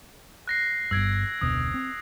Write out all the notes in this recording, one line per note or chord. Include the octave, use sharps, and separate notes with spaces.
F#6 A#6 C7
G1 G2 E6 G#6 D7
F1 D2 B2 D#6
C4